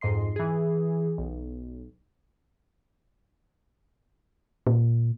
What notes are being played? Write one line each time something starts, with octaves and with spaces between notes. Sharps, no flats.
F2 G#2 D#5 C6 C7
E3 G#4
B1
A#2